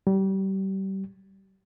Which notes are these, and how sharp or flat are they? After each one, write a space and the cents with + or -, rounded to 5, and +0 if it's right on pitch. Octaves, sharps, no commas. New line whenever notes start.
G3 -30